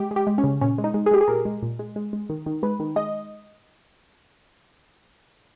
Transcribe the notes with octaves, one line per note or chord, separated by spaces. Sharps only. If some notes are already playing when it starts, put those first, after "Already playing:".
Already playing: G#3 G4
G#3
G4
G#3
C#4
C#3
A#2 C#4
G#3
D#4
G#3
G#4
G#3 G4
G#4
A#2 A#4
G#3
A#2
G#3
G#3
G#3
D#3
D#3
G#3 B4
D#3
G#3 D#5